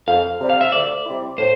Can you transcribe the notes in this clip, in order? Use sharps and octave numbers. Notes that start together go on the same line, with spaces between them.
F2 F5
C3 G3
F5
E5
D2 D5
C3 G3 C4 E4
A2 C5